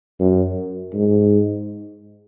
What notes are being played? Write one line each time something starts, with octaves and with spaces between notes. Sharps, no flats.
F#2
G#2